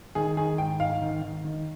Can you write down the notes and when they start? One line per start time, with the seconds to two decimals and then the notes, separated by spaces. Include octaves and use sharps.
0.15 D#3 G#4
0.37 D#3 G#4
0.58 G#2 G5
0.80 G#2 F5
1.01 D#3
1.22 D#3
1.45 D#3